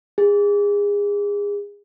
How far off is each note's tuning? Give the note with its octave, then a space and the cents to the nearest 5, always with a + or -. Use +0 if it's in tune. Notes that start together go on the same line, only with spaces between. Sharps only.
G#4 -30